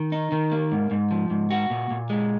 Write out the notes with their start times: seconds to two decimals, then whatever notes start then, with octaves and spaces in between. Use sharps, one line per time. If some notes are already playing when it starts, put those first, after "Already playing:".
Already playing: D#3
0.12 D#4
0.32 D#3
0.52 A#3
0.72 G#2
0.91 G#2
1.11 F3
1.30 G#2
1.50 F#4
1.70 A#2
1.90 A#2
2.10 G#3